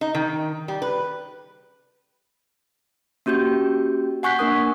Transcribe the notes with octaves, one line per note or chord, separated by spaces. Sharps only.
D#4
D#3
G3
B4
A#3 C#4 F#4 G4 G6
F#5 G#5 C#6 F#6 G6 B6
A#3 D4 A#4 D#6